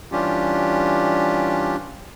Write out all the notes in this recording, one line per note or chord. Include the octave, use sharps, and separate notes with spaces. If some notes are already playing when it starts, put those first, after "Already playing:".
E3 G3 C#4 D4 F4 G4